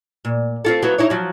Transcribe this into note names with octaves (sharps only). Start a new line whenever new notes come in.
A#2
C4 F4 A4
F#3 B3 E4
D#4 E4 C#5
F3 F#3